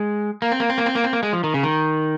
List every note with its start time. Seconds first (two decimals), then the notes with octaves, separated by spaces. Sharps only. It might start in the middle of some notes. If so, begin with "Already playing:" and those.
Already playing: G#3
0.42 A#3
0.52 C4
0.60 A#3
0.70 C4
0.78 A#3
0.86 C4
0.95 A#3
1.04 C4
1.13 A#3
1.23 G#3
1.33 F3
1.44 D#3
1.54 C#3
1.63 D#3